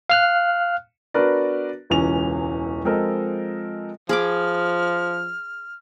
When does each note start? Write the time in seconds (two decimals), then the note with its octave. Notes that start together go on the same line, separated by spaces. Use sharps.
0.10 F5 F6 F#6
1.14 B3 D4 F#4 A#4 B4 D5
1.90 E1 C#2 E3 C#4 F7
2.84 F3 G#3 C4 A4 A#4 D#5
4.09 F3 G#4 B5 D6 F6